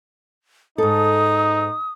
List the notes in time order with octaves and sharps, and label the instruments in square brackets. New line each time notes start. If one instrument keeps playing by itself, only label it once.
[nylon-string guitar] G#2 A4 [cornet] D#4 [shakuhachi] D#6